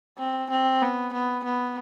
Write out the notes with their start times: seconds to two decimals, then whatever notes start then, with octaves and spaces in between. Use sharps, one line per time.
0.18 C4
0.50 C4
0.82 B3
1.13 B3
1.44 B3